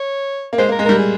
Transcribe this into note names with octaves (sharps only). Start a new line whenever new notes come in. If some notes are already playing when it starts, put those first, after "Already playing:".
Already playing: C#5
A#3
G#3 C5
A#3
A#4
G#3
G3 A#4
G#4